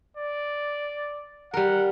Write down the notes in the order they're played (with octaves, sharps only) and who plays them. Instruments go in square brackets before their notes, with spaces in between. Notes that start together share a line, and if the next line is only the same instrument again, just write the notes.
[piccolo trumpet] D5
[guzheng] G3 A#4 [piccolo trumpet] F#5